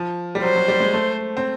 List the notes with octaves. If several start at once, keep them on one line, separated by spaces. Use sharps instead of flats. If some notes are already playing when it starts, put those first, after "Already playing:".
Already playing: F3
G3
F#3 C5
F#3
G3
G#3
A3
C4